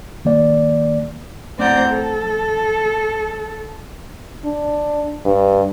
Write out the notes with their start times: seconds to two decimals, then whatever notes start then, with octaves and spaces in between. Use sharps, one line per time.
0.25 D#3 A#3 D5
1.57 A2 C4 D5 F#5 A#5 G6
1.90 A4
4.45 D4
5.25 G2